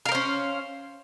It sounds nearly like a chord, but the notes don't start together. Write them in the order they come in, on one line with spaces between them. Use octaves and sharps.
F5 A#4 C5 C#4